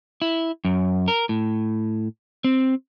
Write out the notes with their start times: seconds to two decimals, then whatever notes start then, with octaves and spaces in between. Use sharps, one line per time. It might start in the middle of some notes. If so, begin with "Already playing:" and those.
0.22 E4
0.65 F#2
1.08 A#4
1.29 A2
2.44 C4